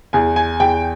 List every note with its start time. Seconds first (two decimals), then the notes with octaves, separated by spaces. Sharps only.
0.13 E2 G#5
0.36 G#5
0.60 E2 G5